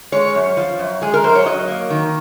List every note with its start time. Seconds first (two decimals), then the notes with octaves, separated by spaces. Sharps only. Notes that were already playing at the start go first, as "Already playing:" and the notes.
0.12 G#3 C#5
0.35 F#2
0.57 F3
0.79 F#2
1.02 G#3 G#4
1.14 A#4
1.23 F#2 C5
1.35 C#5
1.46 F#3 D#5
1.68 A#3
1.90 D#3